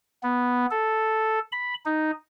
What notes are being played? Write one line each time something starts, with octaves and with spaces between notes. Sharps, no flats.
B3
A4
B5
D#4